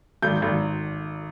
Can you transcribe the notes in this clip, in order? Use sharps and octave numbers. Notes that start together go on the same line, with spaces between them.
G#1 G6
G#1